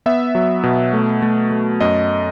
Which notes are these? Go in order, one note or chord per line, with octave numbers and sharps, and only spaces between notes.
B3 E5
F#3
B2
A3
A3
A3
F#2 D#5